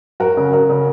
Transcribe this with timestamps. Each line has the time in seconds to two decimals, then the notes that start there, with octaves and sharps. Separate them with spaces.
0.20 F#2 F#4 A#4
0.37 C#3
0.53 C#3 F#4 A#4
0.69 C#3